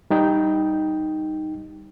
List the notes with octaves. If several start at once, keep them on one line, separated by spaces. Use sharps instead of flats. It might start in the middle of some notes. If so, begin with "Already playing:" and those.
G3 D#4 G5